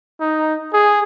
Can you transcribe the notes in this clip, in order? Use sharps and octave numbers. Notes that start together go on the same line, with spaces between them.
D#4
G#4